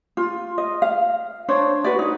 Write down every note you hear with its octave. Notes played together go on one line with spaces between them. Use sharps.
F4
D#5
F5
D4 C5 C#5
F#4 B4 D5
D#4